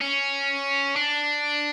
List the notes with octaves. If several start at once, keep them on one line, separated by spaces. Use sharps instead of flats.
C#4
D4